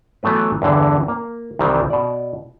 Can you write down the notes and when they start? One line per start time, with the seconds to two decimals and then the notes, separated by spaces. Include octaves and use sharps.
0.23 E3 F#3 A3 B3 B4
0.62 E2 G2 D3 E3
1.08 A#3
1.59 C2 C3 D#3 E3 G3
1.90 B2 D5